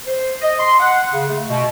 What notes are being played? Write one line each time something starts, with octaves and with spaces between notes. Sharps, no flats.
C5
D#5
C6
F#5
C#3
A3
B2